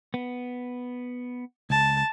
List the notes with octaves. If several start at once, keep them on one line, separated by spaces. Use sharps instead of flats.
B3
C#2 A5